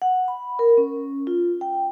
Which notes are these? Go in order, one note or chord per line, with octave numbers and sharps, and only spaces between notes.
F#5
B5
A#4
C#4
F4
G5